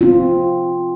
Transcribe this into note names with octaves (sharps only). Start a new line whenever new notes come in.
C4 F4